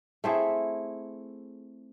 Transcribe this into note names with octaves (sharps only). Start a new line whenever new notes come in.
A3 C4 E4 G#4